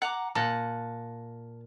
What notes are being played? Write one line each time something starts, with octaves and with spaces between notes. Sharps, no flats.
F#5 A#5 D6
A#2 F#5 A5